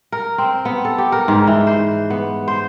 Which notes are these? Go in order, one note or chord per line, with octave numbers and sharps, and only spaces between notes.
A#4
C4
B3
A4
G4
A#4
G#2
E3
C5
B3
C5